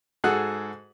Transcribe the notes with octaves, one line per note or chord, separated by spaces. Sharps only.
G#2 F#4 G#4 A4 F#5 F#6